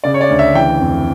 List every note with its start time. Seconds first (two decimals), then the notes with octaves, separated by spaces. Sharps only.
0.04 C#3 D5
0.14 C#5
0.21 D5
0.29 D2
0.39 E5
0.55 E3 G5
0.81 F2